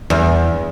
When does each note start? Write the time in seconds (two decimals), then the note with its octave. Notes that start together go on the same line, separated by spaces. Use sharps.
0.10 E2